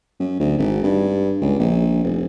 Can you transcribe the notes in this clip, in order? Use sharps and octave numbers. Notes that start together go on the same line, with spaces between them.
F#2
D2
G#1
G2
C#2
A#1
F1